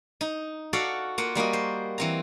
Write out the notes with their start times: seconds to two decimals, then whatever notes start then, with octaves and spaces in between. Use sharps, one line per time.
0.21 D#4
0.73 F#4 A4 D5 F5 F#5
1.18 A#3 F4 F#5
1.35 G3 A#3 F#4 D#5
1.53 C5
1.98 E3 C4 A#5